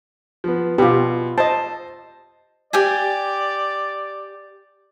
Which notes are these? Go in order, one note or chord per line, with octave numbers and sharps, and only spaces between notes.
F3 B3
B2 F4 G4
C5 D#5 A5
G4 D5 G5 G#5